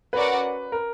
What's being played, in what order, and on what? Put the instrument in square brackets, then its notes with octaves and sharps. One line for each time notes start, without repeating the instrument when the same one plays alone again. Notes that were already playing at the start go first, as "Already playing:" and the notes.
[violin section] C#4 F#4 A#4 D5 F#5 [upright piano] B4
[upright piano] A#4